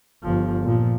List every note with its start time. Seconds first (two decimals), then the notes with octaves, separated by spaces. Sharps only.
0.23 G1 F3
0.63 A#2 F3